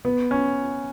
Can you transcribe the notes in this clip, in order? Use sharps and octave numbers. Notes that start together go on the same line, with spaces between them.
B3
C#4